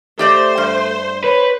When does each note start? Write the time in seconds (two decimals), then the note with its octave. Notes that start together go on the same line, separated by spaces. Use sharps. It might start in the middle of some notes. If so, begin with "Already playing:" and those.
0.19 A3 G4 C5 D5 D#5
0.58 G2
1.24 B4 C#5